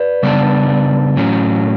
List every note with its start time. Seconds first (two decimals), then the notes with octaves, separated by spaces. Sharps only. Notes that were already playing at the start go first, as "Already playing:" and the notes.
Already playing: B4 D5
0.23 C#3 G3 B3 D4
1.17 A2 F#3 C#4